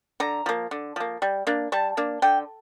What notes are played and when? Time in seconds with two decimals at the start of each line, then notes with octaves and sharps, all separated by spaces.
0.20 D3 A#5
0.46 F3 A#3
0.71 D3
0.96 F3 A#3
1.22 G3
1.47 A#3 D4
1.72 G3 A5
1.97 A#3 D4
2.22 D3 G5